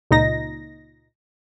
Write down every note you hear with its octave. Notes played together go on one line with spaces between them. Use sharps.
C#2 A#2 D#4 A#6